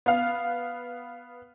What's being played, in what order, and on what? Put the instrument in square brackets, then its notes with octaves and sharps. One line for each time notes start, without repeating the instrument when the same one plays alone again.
[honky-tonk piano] B3 F5